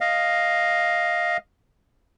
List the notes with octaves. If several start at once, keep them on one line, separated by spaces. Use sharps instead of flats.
D#5 F5